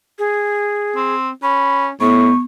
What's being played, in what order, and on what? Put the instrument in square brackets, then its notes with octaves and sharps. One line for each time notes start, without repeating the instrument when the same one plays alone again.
[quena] G#4
[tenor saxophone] C4
[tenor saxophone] C#4 [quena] B5
[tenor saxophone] A2 [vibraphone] B3 [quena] C#6